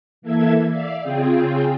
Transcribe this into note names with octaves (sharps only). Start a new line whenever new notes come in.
E3 A#3 A4 E5 G#6
D5 E5 F5
C#3 C4 F4 G#4 G5